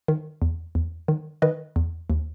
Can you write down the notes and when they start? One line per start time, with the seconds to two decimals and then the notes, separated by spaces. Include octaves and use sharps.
0.08 D#3
0.42 E2
0.75 E2
1.08 D#3
1.42 D#3 B4 D#5
1.76 E2
2.10 D#2